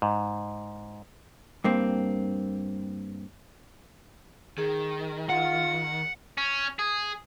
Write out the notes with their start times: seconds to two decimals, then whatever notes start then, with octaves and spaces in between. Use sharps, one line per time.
0.02 G#2
1.64 G2 A#3 C4
4.58 D#3 G#4
5.30 F4 F#5
6.38 C#4
6.79 G#4